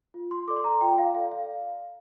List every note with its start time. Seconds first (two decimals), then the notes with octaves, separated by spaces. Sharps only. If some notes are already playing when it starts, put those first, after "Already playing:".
0.14 F4
0.31 C6
0.48 A4 D5 D6
0.56 C6
0.64 A#5
0.81 F4 G5
0.98 F5
1.15 A4 D5 F5
1.31 F5